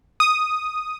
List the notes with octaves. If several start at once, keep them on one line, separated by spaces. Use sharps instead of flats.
D#6